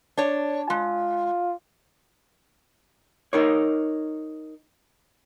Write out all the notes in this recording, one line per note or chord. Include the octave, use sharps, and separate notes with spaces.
D4 C#5
G#3 F4
D#4 A#4 C#5